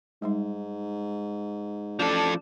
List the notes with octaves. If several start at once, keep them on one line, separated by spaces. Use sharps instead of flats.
G#2 G3 G#3 D#4
A1 F3 D4 A4